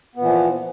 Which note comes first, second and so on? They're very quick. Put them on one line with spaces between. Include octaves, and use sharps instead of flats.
B3 A#2 E3 F3